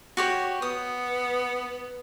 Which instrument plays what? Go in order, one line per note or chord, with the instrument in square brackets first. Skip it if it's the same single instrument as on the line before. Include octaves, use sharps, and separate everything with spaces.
[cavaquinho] F#4 G4 C#5
[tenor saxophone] B3 [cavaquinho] D#6